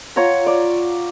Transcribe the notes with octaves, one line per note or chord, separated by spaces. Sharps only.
F4 C#5 F#5 A#5
D5